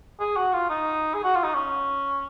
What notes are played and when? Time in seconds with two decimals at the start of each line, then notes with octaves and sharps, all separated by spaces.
0.20 G#4
0.37 F#4
0.53 F4
0.70 D#4
1.14 G#4
1.24 F#4
1.35 F4
1.44 D#4
1.55 C#4